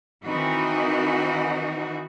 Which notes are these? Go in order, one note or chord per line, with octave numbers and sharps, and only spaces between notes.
D#3 E3 C4 D#4 F#4